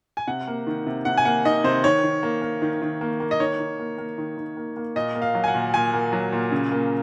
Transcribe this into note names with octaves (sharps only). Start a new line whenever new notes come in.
G#5
C3 F#5
A#3
D#3
C3
C3 F#5
G#5
A#3 F#5
D#3 D#5
C3 C5
D#3 C#5
D#3
A#3
A#3
D#3
D#3
A#3
A#3
D#5
D#3 C#5
D#3
A#3
A#3
D#3
D#3
A#3
A#3
A#2 D#5
A#3
F5
F#3
G#5
F#5
A#2
A#2 G#5
A#3
F#3
A#2
C#3
A#3